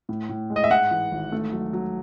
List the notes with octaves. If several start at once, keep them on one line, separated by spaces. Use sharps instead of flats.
A2
A2
G#3
D#5
E5
G#2 F#5
E3
G#1
A3
F#3
F#3